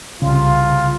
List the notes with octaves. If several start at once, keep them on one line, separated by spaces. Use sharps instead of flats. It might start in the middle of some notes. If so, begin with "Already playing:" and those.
C2 C#3 F4